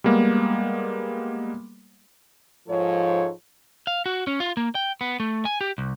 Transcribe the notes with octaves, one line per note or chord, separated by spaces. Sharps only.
G3 G#3 A#3 B3
G#2 F3 A4 C#5
F5
F#4
C#4
F4
A#3
G5
B3
A3
G#5
G4
C2